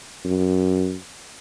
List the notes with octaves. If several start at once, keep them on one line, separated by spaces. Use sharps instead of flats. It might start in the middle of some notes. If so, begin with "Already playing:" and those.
F#2